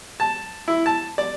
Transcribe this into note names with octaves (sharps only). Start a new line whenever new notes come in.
A5
E4
A5
D5